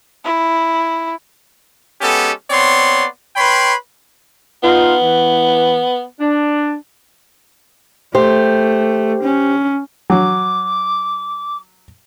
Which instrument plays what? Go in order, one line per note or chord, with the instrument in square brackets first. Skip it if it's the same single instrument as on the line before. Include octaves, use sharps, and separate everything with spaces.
[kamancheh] E4
[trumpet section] G#3 B3 C#4 G4 A4
B3 C4 C#5 D5 C6
B4 C#5 G5 B5 C6
[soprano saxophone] B3 [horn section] D#4 F4
[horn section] E3
D4
[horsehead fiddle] A3 [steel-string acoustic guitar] G4 C5
[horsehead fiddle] C#4
[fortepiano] F#3 [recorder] D6